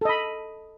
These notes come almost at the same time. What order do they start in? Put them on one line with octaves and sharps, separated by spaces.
A4 D#5 B5